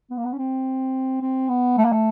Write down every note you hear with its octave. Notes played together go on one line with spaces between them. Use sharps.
B3
A#3
B3
C#4
C4
C4
B3
A3
A#3
A3